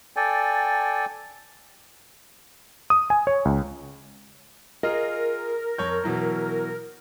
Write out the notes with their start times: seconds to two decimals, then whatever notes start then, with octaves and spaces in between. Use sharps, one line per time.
0.16 A4 D5 G5 G#5
2.90 D#6
3.10 G#5
3.27 C#5
3.45 C#2
4.83 F4 G#4 A#4 D#5
5.78 F2 C#5 G6
6.04 B2 E3 F#3